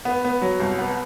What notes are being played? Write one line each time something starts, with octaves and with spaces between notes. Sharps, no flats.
B3
B3
F#3
C2
B3